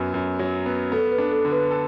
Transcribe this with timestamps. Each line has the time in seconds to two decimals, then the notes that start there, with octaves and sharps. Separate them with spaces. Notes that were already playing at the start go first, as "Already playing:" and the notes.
Already playing: F#2 F#3 B3
0.14 F#2
0.39 F#3
0.66 B3
0.92 B3 A4
1.12 B4
1.18 D4
1.31 A4
1.45 D3
1.52 B4
1.71 A4